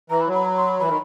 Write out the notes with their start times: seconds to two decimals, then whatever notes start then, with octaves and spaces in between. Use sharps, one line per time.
0.10 E3 A#5
0.21 B5
0.27 F#3
0.34 B5
0.45 A#5
0.57 C6
0.68 B5
0.79 E3 B5
0.88 D#3